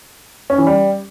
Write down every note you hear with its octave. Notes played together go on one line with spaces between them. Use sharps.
C#4
E3
G3